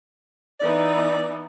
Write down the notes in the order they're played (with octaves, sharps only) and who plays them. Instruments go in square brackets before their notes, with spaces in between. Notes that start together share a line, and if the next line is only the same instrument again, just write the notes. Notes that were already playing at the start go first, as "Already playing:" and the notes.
[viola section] E3 B3 D#4 [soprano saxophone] D5